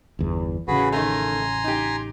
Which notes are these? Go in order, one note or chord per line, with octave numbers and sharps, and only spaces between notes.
G1 E2
A1 C#3 F#4 G#4 B4
D#3 A3 G#5 A#5 C6
D#4 G4